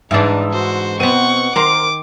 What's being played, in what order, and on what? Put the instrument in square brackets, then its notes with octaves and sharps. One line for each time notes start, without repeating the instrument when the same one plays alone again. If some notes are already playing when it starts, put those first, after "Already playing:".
[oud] G#2 E3 D4 [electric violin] D#4 [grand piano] E5
[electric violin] F#4 C5
[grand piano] B2 C5 D#7 [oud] B3 C4 [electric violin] F#5 C#6
[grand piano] D#3 C6 [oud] A#4 C5 [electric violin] D6